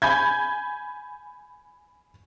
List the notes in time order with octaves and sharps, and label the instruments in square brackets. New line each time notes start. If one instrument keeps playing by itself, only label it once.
[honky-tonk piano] G#5 B5 G6 G#6